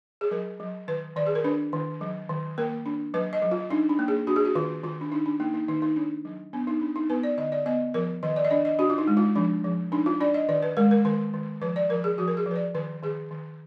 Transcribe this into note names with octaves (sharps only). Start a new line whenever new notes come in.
G#4
F#3 A#4
F#3
D#3 B4
D#3 D5
G#4
A#4
D4 B4
D#3
F#3
D#3
A#3 A#4
D4
F#3 B4
D#5
F#3
F4
D4 D#4
D4
A#3
G#4
D4 F#4
G#4
F#4
D#3 F4
D#3 F4
D4
D4 D#4
D4
A#3 D#4
D#4
D#3 D#4
D#4
D4
F#3
B3 D4
D#4
D4
D#4
B3 B4
D5
D3 D#5
D5
B3 D#5
F3 A#4
D#3 D#5
D5
D#5
D4 D5
D#5
D4 F#4
F4
D#4
G#3
F4
F3 D4
F3
D4 D#4
F4
D4 D5
D#5
D#3 D5
B4
G#3 A#4
A#4
D#3 A#4
D#3
F3 B4
D5
F3 A#4
G#4
F3 F#4
A#4
G#4
F3 B4
D5
D#3 B4
D#3 G#4
D#3